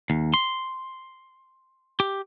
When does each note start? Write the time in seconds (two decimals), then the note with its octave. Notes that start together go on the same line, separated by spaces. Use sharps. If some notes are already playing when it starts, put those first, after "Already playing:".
0.10 D#2
0.34 C6
2.00 G4